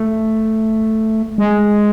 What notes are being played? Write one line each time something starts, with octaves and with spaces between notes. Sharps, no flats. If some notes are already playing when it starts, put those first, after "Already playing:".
Already playing: A3
G#3